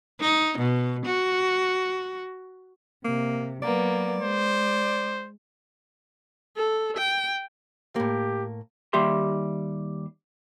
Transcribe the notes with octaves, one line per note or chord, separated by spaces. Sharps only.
D#4
B2
F#4
C3 A#3
F#3 A#3 B3 D5
G#3 C5
A4
G5
A2 A#3 G4
D#2 G3 G4 E5 C6